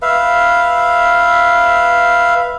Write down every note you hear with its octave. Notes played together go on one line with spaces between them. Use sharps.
B4 E5 F5